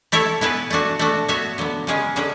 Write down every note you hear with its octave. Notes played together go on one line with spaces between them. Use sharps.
A3 E4 A4 C#5 E5
B3 E4 G#4 B4
A3 D4 F#4
A3 D4 F#4
B3 F#4 C#5 E5
D3 F#3 B3
C#3 G#3 C#4 G#4
D3 F#3 C#4 G#4